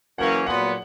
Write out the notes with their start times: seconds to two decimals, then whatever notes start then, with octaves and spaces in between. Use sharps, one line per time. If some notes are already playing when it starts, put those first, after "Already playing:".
0.18 F#2 C#3 E3 A#3 C#4 F#5
0.46 A#2 F#3 B3 F#5